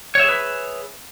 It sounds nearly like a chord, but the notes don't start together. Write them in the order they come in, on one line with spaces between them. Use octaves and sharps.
C#5 E5 G#4 B4